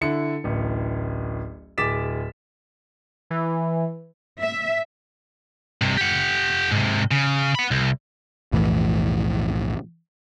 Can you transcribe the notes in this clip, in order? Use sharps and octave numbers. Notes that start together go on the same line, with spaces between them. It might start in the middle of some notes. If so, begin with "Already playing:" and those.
D3 E4 C#7
D1 A1
D1 G#4 D6 A6 B6 E7
E3
E5
G2 C3
G4 F#5
G#2 C3
C#3
F#5 B5
C2
B1 F2 A2 E3